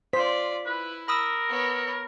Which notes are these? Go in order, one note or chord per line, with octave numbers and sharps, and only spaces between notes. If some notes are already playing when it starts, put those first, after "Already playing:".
F4 C5 D5 B6
E4 B4
A#4 B5 D#6 E6
B3 C#5